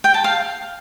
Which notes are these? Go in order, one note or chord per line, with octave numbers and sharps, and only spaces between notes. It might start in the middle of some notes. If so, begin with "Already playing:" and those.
G5
A5
F5